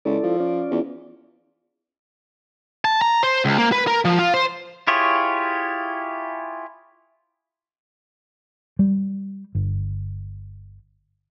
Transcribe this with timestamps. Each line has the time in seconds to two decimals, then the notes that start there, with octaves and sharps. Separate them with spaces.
0.05 C#2 E4 A4 D5
0.23 F3
0.40 C#4 F4 D5
0.71 E2
2.85 A5
3.01 A#5
3.23 C5
3.45 C#2
3.58 A#3
3.72 B4
3.87 A#4
4.05 F3
4.19 F4
4.34 C5
4.87 E4 F4 G4 G#4 C#5
8.79 G3
9.55 G1